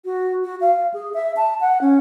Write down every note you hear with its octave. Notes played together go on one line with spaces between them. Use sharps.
F#4
F#4
F5
G#4
E5
A5
F#5
C#4